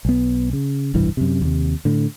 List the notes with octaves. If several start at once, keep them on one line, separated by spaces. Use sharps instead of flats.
B1 B3
C#3
F1 B1 G2 E3
F#2 C3
D#2 C3
A2 D3